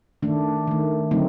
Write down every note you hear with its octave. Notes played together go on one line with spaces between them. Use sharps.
D#3 A3 D4
D#3 A3
D3 F#3 A3 C4 D#4